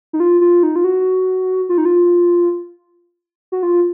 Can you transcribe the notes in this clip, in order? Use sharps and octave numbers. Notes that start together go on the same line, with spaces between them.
D#4
F4
F4
D#4
F4
F#4
F4
D#4
F4
F#4
F4